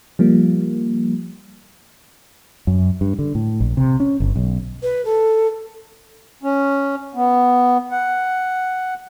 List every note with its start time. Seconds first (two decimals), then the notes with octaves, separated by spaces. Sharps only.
0.19 F3 G3 A#3
2.67 F#2
3.01 G2
3.19 D3
3.35 A2
3.60 A#1
3.77 C3
4.00 C#4
4.20 G1
4.36 B1
4.82 B4
5.04 A4
6.43 C#4
7.15 B3
7.91 F#5